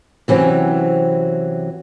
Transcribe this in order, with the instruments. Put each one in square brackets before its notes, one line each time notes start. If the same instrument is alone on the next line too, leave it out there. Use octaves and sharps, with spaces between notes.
[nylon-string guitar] C3 E3 F#3 C4 C#4